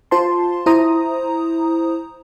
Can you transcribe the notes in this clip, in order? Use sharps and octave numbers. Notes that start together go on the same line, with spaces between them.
F4 C5 A5 C6
E4 C5 A#5 D#6